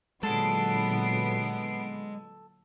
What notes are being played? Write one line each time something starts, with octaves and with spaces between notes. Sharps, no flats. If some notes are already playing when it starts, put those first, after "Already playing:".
A#2 D3 F#3 G#3 B3 A4 C7 D7